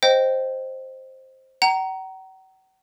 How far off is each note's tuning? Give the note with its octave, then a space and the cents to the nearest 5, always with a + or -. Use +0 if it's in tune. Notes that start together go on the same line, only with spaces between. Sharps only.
C5 +5 D#5 +0 G5 -10
F#5 +45 A#5 +0